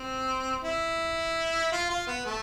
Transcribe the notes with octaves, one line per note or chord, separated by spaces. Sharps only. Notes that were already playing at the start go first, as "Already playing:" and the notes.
Already playing: C4
E4
F4
F4
B3
A3